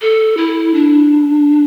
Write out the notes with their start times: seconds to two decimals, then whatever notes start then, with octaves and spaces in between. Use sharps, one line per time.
0.02 A4
0.37 E4
0.74 D4